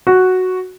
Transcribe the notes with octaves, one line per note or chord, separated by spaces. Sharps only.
F#4